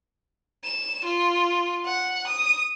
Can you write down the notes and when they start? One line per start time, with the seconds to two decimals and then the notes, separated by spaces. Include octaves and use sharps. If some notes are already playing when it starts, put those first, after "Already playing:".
0.64 E7
1.05 F4
1.86 F#5
2.28 D#6